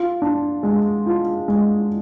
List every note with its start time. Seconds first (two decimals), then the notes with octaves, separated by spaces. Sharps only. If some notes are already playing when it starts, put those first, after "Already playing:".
Already playing: F4
0.22 D4
0.63 G#3
1.06 F4
1.48 G#3